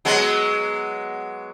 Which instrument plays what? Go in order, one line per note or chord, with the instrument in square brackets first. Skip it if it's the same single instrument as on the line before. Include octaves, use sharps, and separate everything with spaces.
[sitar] F#3 G#3 B3